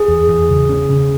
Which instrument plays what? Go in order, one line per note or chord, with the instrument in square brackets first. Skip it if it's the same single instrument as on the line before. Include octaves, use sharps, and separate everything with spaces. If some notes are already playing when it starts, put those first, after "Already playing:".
Already playing: [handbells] G#4
[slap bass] E2
E2
C#3
C#4
C#3